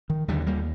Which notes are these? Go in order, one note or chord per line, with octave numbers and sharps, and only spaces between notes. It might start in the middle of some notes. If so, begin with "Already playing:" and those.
D#3
D#2 D3 D#3 G3
G3 A#3